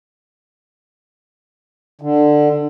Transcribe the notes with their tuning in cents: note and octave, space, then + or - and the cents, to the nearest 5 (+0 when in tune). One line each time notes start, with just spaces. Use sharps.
D3 +15